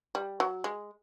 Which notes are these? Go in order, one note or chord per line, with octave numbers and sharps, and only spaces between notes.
G3
F#3
G#3